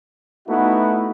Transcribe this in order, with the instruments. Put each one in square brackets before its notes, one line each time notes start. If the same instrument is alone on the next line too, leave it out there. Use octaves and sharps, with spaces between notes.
[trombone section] A3 B3 D#4 E4 F#4